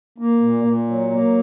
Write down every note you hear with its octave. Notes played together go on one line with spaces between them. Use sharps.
A#3
A#2
A#2
F#3
A#3